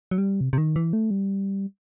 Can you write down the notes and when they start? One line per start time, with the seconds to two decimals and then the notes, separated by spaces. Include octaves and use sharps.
0.11 F#3
0.18 G3
0.41 C3
0.53 C3
0.58 D#3
0.76 E3
0.93 A3
1.11 G3